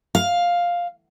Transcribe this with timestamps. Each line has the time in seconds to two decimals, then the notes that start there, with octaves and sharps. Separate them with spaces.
0.15 F5